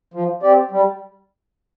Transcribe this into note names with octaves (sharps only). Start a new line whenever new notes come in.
F3
C4 G4 D5
G3